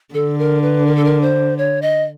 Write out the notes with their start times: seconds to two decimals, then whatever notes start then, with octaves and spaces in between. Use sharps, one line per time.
0.14 D3 A4
0.39 A#4
0.62 B4
0.87 A#4
0.96 A4
1.05 A#4
1.22 C5
1.58 C#5
1.82 D#5